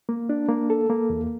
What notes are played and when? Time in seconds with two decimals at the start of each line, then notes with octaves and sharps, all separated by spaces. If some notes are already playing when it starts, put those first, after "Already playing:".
0.09 A#3
0.29 D4
0.49 A#3
0.70 A4
0.90 A#3
1.10 E2